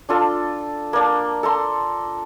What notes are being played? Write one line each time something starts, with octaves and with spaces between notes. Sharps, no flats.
D4 F4 A4
A#3 D4
A4 A#5 C6